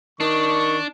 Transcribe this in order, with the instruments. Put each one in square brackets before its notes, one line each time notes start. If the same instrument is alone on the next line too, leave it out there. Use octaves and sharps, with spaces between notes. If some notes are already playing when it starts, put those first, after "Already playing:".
[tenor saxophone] D#3 [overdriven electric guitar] D4 [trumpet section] C#6